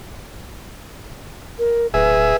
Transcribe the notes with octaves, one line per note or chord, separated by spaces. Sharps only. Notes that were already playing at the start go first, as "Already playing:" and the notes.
A#4
D1 G#4 B4 E5